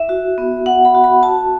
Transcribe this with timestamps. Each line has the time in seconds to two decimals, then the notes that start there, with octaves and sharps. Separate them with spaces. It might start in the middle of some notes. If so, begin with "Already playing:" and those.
Already playing: E4 E5
0.09 F#4
0.38 B3
0.66 B3 F#5
0.85 B5
0.95 F#4
1.04 B5
1.23 F#4 A5